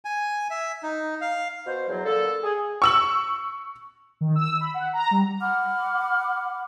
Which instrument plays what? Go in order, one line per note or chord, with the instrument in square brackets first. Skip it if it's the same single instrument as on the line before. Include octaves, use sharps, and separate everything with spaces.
[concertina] G#5
E5
D#4
F5
[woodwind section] B2 C5
E2 F#3
D3 A#3 A4
G#4
[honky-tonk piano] C#6 E6 F#7
[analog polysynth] D#3
E6
B5
F#5
A#5
G3
[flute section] F#5 B5 D6 F6